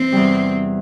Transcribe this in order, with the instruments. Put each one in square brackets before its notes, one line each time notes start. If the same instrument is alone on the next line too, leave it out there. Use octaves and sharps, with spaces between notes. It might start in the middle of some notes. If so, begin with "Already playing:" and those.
Already playing: [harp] E3 [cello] C4
[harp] E2 C3 G3